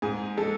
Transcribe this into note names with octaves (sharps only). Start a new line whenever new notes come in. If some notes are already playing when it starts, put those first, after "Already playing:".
G#2 G#4
G#3 A4